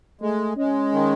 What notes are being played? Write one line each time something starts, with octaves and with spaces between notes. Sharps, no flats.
G#3 A3
G#3 C#4
D#3